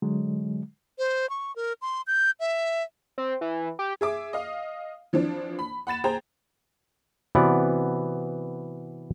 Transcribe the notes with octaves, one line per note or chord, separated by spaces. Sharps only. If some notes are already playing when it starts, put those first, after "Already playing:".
D3 F#3 G#3
C5
C#6
A#4
C6
G6
E5
C4
E3
G4
G#4 E5 D6
D#5 F5
E3 F3 C4 D4
B5
F#5 B5 A6 E7
G#4 C5 G5 A#5
C3 E3 B3 F#4 C5 D5